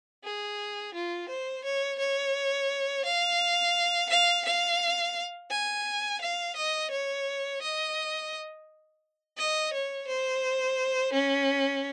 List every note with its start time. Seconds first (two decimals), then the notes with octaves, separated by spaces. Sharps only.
0.24 G#4
0.94 F4
1.29 C5
1.64 C#5
1.99 C#5
3.05 F5
4.10 F5
4.45 F5
5.51 G#5
6.21 F5
6.56 D#5
6.91 C#5
7.62 D#5
9.37 D#5
9.73 C#5
10.07 C5
11.13 C#4